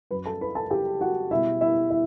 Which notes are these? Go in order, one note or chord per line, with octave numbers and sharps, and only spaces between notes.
F#2 F#3 B4 B5
A4 A5
B4 B5
A4 A5
G4 G5
F#4 F#5
B2 G3 E4 E5
E4 E5
E4 E5